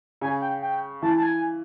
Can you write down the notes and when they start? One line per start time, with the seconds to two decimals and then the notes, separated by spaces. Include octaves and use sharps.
0.21 C#3 G#5
0.42 G5
0.62 G5
1.02 E3 A5
1.17 A5
1.23 G#5